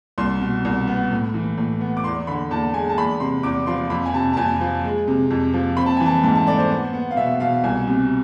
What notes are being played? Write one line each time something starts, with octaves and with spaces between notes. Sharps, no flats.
C2 C6
B2
C2
B3
A2
E3
A2
B3
D6
E2 C6
D3 B5
E2 A5
G#3 G#5
A5
E2 B5
C3 C6
E2 D6
F3 C6
F2 B5
G#5
C3 A5
A5
F2 G#5
F3
G#3
C3
F2
F3
C4 B5
A5
E3 G#5
A5
G#2 A5
A5
A3 D5
C5
B3
B3
F5
B2 E5
B2 F5
C2 G#5
C3